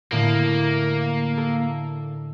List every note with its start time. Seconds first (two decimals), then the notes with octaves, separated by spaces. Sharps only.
0.12 A2 D3 A#3
1.38 A4